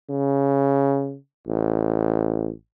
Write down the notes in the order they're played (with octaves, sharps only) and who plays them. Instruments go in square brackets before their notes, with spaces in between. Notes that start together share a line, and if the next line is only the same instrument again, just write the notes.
[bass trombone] C#3
A1